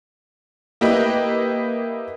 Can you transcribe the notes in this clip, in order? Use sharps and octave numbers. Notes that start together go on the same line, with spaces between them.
A#3 E4 G4 B4 D#5